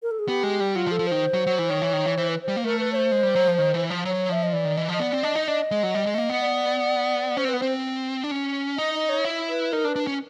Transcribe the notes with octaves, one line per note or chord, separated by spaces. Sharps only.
A#4
A4
G#4
B3 G4
G#3
G3
F#3 F4
F3
A4
F3
D#3 C5
F#3
F#3
E3
D#3 C#5
E3
D#3
E3
E3 C5
B4
C5
G3
A#3
A3 A#4
B4
C#5
C5
G#3
G3
F#3
F3
D#3
E3
F3
F#3 C#5
F3 E5
D#5
E3 D5
D#3
E3 D#5
F3 D#5
B3 D5
C4
D4 D#5
D#4
D4 D#5
G#3
F#3
G3
G#3
A3
A#3
B3
D5
C#4 C5
C4
B3 B4
C4 C5
D4
C#4
D#4 D#5
D#5
C#5
E4
B4
D#4 A#4
D4
B4
D4
C#4